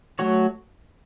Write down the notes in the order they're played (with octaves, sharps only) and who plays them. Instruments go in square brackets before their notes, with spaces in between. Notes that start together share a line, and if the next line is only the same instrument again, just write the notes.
[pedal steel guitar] F#3 A3 F#4 C#5